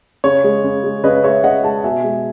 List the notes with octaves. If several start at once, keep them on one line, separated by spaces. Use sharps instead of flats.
C#3 C#5
G#3
C#3
G#3
C#3 B4 D#5
G#3 C#5 E5
C#3 D#5 F#5
G#3 F#5 A5
B2 E5 G#5
G#3